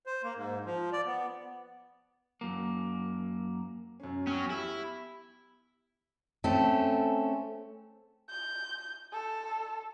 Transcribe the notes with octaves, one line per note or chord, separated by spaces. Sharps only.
C5
A#3
G#2
F3
D5
B3
F#2 A#3
F#2 C#4
F#3 B3 C#4 F6
E4 G4
A3 C4 C#4 A4
G6
A4